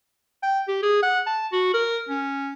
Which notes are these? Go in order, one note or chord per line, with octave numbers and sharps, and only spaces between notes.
G5
G4
G#4
F#5
A5
F#4
A#4
C#4